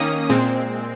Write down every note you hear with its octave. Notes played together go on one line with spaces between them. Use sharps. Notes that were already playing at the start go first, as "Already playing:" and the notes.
Already playing: D#3 A#3 C#4 D#6
A#2 G#3 C4